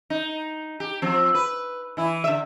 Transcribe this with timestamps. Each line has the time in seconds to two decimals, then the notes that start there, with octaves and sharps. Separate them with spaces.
0.10 D#4
0.80 G4
1.02 F3 C4
1.35 B4
1.97 E3 E4
2.24 D3 E5